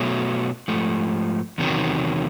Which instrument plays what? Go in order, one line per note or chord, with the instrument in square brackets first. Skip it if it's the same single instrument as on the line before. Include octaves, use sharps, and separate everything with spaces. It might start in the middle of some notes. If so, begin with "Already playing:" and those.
Already playing: [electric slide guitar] B2 F#3 A3
G#2 F3 A3
E2 C3 D#3 F#3